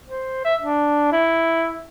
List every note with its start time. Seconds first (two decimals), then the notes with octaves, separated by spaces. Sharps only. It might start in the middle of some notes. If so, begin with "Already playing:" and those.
0.09 C5
0.45 E5
0.62 D4
1.12 E4